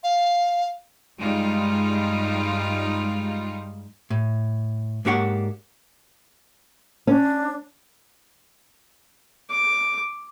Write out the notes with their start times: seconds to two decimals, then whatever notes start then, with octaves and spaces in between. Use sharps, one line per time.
0.04 F5
1.20 G2 G3 G#3 D#4 F4
4.10 A2
5.05 G#2 A#3 D4 G4 C#5 F#5
7.07 C#4 D4
9.50 D6